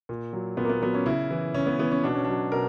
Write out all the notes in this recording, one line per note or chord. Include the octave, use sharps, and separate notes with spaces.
A#2
F#3
A#2 B3
A#3
B3
F#3 B3
C#4
C#3 E4
E3
C#3 C#4
B3
E3 B3
C#4
B2 D4
C#4
F#3 D4
B2 A#4